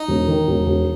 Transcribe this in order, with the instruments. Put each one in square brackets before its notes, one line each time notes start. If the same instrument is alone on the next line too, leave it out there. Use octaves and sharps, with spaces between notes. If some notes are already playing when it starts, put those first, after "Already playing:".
Already playing: [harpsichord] D#4
[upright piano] E1
D#3
E1
E1